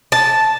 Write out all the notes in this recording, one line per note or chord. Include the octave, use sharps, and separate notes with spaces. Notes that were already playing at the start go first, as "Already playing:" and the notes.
A5